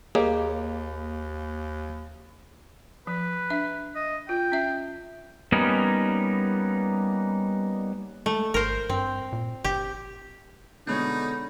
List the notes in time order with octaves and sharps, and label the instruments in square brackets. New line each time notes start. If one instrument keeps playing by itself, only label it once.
[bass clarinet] D#2 [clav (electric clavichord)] A#3 [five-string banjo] G4 C#5 D#5 [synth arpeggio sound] G#4
[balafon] F3 [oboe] B4
[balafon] D4 E5
[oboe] D#5
[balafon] F4 [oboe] G5
[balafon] C#4 E5
[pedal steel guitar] G3 A#3 B3 C#4 D#4
[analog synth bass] G#3 [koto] A3
[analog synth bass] G#1 [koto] A#4 C5
[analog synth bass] G2 [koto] C4
[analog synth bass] A#2
[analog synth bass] G1 [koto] G4
[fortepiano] B2 G#3 C#5 [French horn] D3 [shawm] D#4 [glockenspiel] B5 G6